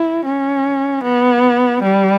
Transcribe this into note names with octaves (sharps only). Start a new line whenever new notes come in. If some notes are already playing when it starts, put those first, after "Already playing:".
Already playing: E4
C#4
B3
G3